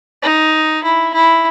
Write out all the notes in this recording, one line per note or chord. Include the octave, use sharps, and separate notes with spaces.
D#4
E4
E4